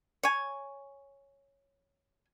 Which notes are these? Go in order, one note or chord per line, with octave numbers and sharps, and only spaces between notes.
C#5 G#5